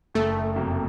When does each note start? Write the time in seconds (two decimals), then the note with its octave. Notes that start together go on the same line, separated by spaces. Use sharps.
0.15 F#1 A3
0.55 F2 C3 F#3 A#3